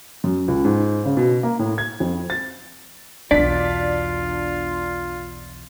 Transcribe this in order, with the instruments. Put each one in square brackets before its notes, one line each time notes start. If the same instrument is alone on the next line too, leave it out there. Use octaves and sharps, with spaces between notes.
[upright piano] F#2
C#2
G#2
C#3
B2
A#3
A2
G#6
F2
A6
[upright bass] B1 E2 [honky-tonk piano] D4 B6 [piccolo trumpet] F4 [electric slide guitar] D5